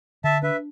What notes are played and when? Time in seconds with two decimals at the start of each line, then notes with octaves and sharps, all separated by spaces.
0.24 D3 E5 A5
0.43 D4 B4 E5